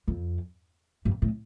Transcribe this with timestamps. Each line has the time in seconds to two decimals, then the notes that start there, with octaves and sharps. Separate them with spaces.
0.08 F2
1.05 G2
1.22 A2